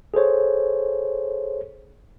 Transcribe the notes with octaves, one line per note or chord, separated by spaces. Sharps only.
G#4 A4 C5 C#5